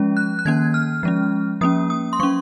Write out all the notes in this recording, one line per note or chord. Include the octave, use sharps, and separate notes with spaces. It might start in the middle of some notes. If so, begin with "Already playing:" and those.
Already playing: F3 G#3 C#4
F#6
F#6
D#3 A#3 C#4 G#6
F6
F3 G#3 C#4
F3 A#3 C#4 D#6
D#6
C6
F#3 C#4 C#6